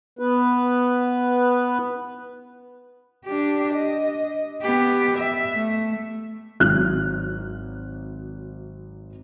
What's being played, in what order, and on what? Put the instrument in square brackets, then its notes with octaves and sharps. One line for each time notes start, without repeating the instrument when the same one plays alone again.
[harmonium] B3 B4
[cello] D4 G4
D#5
B3 G4
E5
A3
[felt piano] G#1 F#3 F6 F#6